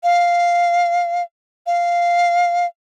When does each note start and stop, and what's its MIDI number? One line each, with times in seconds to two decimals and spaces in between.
0.03 1.23 77
1.67 2.66 77